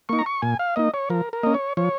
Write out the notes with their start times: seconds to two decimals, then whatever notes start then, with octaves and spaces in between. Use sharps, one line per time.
0.09 A#3 D#4 C#6
0.19 A#5
0.26 C#6
0.42 A#2 G#5
0.59 F5
0.76 A#3 D#4 D#5
0.94 C#5
1.10 F3 A#4
1.33 A#4
1.43 A#3 C#4 D#5
1.54 C#5
1.77 F3 C#5